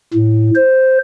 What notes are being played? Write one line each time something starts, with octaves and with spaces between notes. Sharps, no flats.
A2
C5